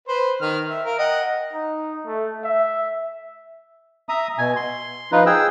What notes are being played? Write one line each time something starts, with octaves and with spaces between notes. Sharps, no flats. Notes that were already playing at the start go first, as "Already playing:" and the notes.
B4 C5
D#3 F6
E5
A#4 F5
D#5 F#5 G5
D#4
A3
E5
E5 A#5 D#6
B2 G#5
C6
F3 D#4 F4 B4
G#4 G5 E6